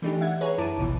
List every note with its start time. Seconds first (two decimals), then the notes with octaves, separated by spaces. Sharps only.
0.02 E3 A3 D4 D#4 G4
0.21 E5 F#5 G#6
0.41 G#4 B4 C#5 A#5
0.58 F#2 E4 A5 D6 D#7
0.78 G#1 C#2 B2 E3